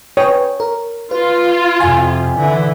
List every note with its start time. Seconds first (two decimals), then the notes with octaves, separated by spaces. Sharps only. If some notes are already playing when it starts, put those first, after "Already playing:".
0.17 B4 C#5 G5
0.60 A#4
1.11 F4 B4
1.80 F2 C3 G#5
2.38 D3 E3